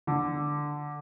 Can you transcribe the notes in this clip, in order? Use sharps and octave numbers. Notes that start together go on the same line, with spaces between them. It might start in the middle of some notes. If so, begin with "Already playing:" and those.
D3